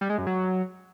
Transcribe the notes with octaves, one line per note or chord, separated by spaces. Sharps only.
G3
G#3
F#2
F#3